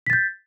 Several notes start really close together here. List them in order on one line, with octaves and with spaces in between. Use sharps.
B6 A6 G6